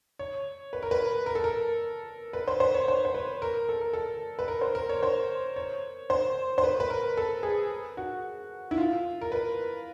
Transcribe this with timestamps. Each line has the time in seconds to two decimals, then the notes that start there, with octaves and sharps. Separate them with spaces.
0.19 C#5
0.73 B4
0.83 A#4
0.91 B4
1.26 A#4
1.35 A4
1.44 A#4
2.33 B4
2.48 C5
2.60 C5
2.74 C#5
2.88 C5
3.05 C5
3.15 B4
3.42 A#4
3.69 A4
3.81 A#4
3.93 A4
4.39 B4
4.48 A#4
4.61 C5
4.75 A#4
4.89 C#5
5.03 C5
5.56 C#5
6.10 C5
6.58 C5
6.64 B4
6.80 B4
6.90 A#4
7.17 A4
7.43 G#4
7.97 F#4
8.71 E4
8.78 F4
9.21 A#4
9.32 B4